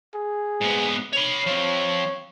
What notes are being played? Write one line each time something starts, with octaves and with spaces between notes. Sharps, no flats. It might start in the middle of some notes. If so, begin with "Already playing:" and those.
G#4
G#2 B3
C#5 B5
F3 C4 C#5